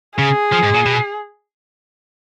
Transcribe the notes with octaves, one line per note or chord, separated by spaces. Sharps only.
C#3 G#4
F3
G#2
A#2
B2